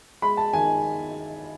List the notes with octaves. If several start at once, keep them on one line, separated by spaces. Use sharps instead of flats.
G#3 B5
A5
D#3 G#5